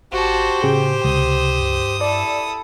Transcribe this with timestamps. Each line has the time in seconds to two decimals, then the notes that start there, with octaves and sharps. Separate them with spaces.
0.12 G#1 F#4 G4 C5 A5
0.63 A2 C#3 G#4 G5
1.04 C#2 C3 D#6
1.59 G2
2.01 E4 A4 D5